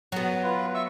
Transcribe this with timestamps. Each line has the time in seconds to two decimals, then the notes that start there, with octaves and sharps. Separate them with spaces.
0.12 F#3 B3
0.44 F4 B4
0.75 E5 C#6 E6